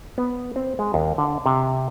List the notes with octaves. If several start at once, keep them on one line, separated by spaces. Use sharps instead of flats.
B3
C4
G#3
D#2
D3
C3